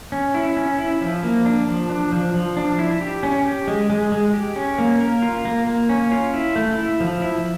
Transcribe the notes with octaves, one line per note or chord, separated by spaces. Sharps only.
C#4
E4
C#4
E4
F3
A#3
D4
F3
D4
F3
F3
D4
E4
G4
C#4
G4
G#3
G#3
G#3
G4
C#4
A#3
A#4
F4
A#3
A#3
C#4
F4
E4
A3
E4
F3
E4